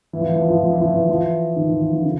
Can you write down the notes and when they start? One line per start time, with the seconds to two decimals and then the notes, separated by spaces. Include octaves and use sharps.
0.13 E3
0.20 F3
0.28 E3
0.36 F3
0.42 E3
0.50 F3
0.58 E3
0.64 F3
0.72 E3
0.80 F3
0.88 E3
0.95 F3
1.03 E3
1.09 F3
1.17 E3
1.56 D#3
1.69 D#3
1.80 E3
1.93 F3
2.01 D3
2.05 C#3